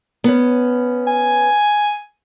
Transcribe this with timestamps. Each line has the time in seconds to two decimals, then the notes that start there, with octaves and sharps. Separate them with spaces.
0.24 B3 C#4
1.07 G#5